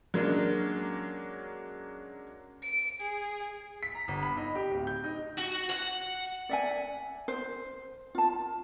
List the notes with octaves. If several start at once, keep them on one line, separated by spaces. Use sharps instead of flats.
F#3 G#3 A#3 C#4 D4
D7
G#4
B6
A#5
G1
B5
D#4
G4
D1
G6
D#4
F#4
F#5
D5 E5 G#5
C5
F4 A5